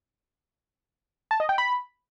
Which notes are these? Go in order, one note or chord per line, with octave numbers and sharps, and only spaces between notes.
A5
D#5
G5
B5